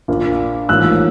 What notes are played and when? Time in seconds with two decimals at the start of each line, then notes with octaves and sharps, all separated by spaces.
0.08 A#1 A#2 F3 A#3 D4
0.69 A1 G#2 F3 A#3 C#4 E6 F#6